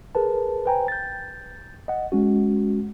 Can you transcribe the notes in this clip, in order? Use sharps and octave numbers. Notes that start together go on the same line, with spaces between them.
G#4 A#4 B4 A5
B4 C5 G5 G#5 A#5
G6 A6
D#5 F#5
G#3 C#4 F#4